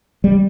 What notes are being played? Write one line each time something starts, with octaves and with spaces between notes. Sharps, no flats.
G3